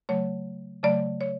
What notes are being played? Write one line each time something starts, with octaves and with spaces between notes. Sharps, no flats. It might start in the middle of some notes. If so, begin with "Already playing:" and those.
C#3 F#3 A3 C#5
C#3 F#3 A3 D5
C#5